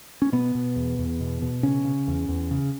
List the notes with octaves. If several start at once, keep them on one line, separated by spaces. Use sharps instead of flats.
C#4
B2 B3
B2
E2
E2
B2
B2
C#3 C#4
C#3
E2
E2
C#3